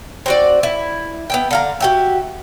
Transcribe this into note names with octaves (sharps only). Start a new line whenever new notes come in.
C4 F#4 D5
E4
B3 E5 G5
D3 F5 A#5
F#4 G4 E5